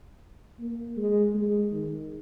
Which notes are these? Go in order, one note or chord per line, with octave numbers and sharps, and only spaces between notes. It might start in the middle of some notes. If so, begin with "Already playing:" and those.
A#3
G#3
G#3
D#3